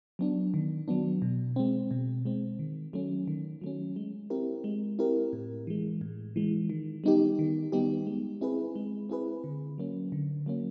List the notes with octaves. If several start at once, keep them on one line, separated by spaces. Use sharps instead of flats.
F#3 B3 D4
D#3
F#3 B3 D4
B2
G#3 C4
B2
G#3 C4
D#3
F#3 A3 C#4
D#3
F#3 A3 C#4
G#3
C4 E4 G4 A#4
G#3
C4 E4 G4 A#4
A2
E3 G#3
A2
E3 G#3
D#3
G3 B3 D#4 G4
D#3
G3 B3 D#4 G4
G#3
C4 E4 G#4 B4
G#3
C4 E4 G#4 B4
D3
F#3 A#3 C#4
D3
F#3 A#3 C#4